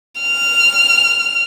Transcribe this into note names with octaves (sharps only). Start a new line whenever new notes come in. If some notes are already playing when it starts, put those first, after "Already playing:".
F6